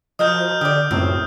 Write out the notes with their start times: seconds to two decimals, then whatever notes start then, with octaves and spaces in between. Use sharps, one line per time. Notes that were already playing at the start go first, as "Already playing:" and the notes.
0.19 F3 F#4 A#4 D#5 D#6 F6 G6
0.61 D3 G4 D5 D#6
0.91 C#2 F#2 A2 C3 C4